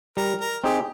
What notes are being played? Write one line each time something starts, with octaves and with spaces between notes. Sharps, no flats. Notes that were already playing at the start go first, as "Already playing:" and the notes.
G3 A#4
A#4
C4 D#4 G4 G#4